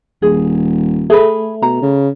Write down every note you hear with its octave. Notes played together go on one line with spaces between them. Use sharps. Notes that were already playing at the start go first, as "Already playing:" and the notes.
D#1 G#4
A3 G#4 B4
B2 A#5
C#3